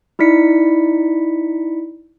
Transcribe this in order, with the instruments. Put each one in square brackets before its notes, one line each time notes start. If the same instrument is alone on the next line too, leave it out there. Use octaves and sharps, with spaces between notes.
[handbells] D#4 E4 D5 B6 C#7